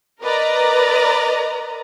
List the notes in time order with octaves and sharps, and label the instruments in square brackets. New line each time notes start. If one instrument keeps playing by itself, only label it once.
[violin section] A#4 B4 D5 D#5 A#5